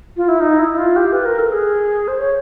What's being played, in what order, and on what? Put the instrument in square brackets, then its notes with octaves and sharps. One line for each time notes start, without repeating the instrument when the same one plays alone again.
[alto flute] F4
E4
D#4
E4
F4
G4
B4
A#4
A4
G#4
C5
C#5